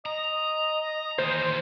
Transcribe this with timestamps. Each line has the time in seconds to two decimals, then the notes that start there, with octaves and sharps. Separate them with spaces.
0.06 D#5 A#5
1.18 D#2 E3 C5